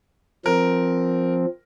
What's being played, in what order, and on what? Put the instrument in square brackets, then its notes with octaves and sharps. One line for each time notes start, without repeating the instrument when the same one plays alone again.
[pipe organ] F3 C4 [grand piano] A#4